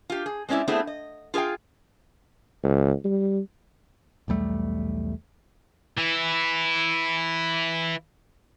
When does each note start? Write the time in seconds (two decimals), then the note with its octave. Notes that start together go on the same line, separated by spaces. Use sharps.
0.10 F4 G4
0.26 G#4
0.49 G#3 C4 C#4 D#4 E4 D5
0.68 A3 B3 C4 D4 E4 G#4
0.87 D#5
1.34 F4 G#4 A4 F5 G5
2.63 C#2
3.05 G3
4.28 B1 E2 G3 A3
5.98 E3 E4